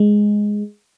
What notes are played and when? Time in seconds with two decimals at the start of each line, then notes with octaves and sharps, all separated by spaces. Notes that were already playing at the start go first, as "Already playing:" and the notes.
Already playing: G#3